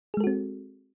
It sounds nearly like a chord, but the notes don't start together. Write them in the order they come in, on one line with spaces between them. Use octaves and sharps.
G#4 G#3 A4 F#4 C4